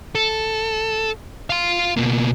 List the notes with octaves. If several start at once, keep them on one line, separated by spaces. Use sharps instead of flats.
A4
F5 C6
B2 A#3